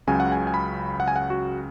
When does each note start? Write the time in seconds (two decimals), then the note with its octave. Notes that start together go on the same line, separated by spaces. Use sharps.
0.07 C#2 C#3 F#3 G#5
0.20 F#5
0.32 G#5
0.47 G#5
0.54 B5
1.00 F#5
1.08 G#5
1.16 F#5
1.30 F#4